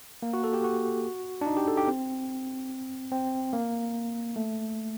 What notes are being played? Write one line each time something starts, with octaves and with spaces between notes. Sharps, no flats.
A#3
F#4
A4
G4
F#4
D4
D#4
G4
A4
G4
C4
C4
A#3
A3